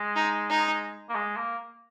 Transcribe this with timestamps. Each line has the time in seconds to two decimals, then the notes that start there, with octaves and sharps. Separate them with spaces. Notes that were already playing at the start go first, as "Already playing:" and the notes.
Already playing: G#3
0.16 D#4
0.49 D#4
1.09 A#3
1.15 G#3
1.37 A#3